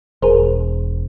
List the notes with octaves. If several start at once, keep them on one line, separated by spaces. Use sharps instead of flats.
E1 G#4 A#4 C5